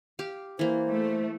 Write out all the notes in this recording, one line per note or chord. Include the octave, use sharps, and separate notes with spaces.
G4 F5
E3 A#3 C5
A3